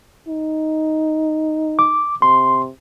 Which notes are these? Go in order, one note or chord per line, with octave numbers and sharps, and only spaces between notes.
D#4
D6
C3 C6